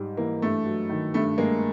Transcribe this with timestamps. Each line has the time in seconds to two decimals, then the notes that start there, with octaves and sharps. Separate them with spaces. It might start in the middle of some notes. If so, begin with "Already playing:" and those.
Already playing: G#2 G3
0.17 E3 A#3
0.42 G2 A3
0.66 F#3
0.89 D#3
1.14 G2 A3
1.38 G#3 A#3